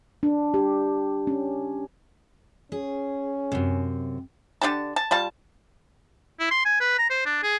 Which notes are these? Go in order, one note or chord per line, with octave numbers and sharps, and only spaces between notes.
D4
G4
C#4
C#4 G#4
F#2 C3
D3 D4 G4 A5
A5
G3 F4 A5
E4
C6
G#5
B4
A#5
C5
D4
G#4